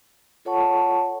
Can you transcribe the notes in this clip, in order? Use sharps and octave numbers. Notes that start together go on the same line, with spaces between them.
F4 A4 C#5 F#5 A5 C#6